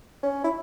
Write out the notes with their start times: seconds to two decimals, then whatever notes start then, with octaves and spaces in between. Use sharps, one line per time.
0.23 C#4
0.44 E4